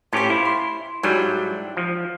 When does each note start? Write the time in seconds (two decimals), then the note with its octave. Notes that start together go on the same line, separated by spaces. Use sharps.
0.13 A2 C#4 F4 G4 C5
0.30 E4
0.45 C6
1.03 G#2 F#3 G3 D4 E4 G5
1.77 F3